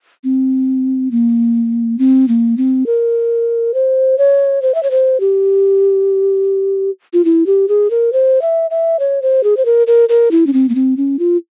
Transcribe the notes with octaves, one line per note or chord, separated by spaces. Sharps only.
C4
A#3
C4
A#3
C4
A#4
C5
C#5
C5
E5
C#5
C5
G4
F4
E4
G4
G#4
A#4
C5
E5
E5
C#5
C5
G#4
C5
A#4
A#4
A#4
E4
C#4
C4
A#3
C4
C#4
F4